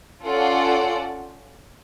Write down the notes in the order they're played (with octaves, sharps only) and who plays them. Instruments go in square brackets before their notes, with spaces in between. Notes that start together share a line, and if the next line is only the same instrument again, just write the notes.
[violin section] C#4 F4 A4 D5 F#5